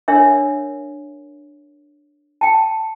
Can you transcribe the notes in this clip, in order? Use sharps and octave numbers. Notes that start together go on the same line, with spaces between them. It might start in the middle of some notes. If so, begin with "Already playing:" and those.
D4 A#4 C#5 E5
G5 A5